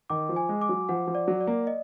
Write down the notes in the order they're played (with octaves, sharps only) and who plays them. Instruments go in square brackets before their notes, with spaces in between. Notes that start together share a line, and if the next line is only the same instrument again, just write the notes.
[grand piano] D#3 [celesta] D6
[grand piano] F3
[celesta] G#5
[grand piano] G#3
[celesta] D6
[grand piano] F#3
[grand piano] F3 [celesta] F#5
[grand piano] F3
[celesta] D5
[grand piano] F#3
[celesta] D5
[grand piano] A#3
[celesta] D#5